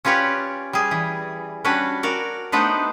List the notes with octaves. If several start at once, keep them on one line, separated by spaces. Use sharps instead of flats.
C#4 F4 G4 B4 C#5 D5
G3 G#4
E3
G3 C#4 D4 F#4 B4 A5
F#4 A#4 D5
A3 B3 D4 D#4 B4 C5